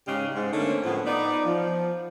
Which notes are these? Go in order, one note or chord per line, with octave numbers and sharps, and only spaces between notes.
G#2 C#3 G#3 C#4 G4 F5
G#2
D3 A3 A#3 C4 C#4
A2 F3 B3
B3 D#4 D5
F3